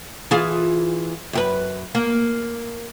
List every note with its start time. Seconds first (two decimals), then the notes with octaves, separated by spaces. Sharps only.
0.31 E3 F4 G#4
1.33 F#2 G4 B4
1.95 A#3